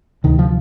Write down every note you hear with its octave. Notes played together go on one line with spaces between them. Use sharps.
D2 C3 D#3
F3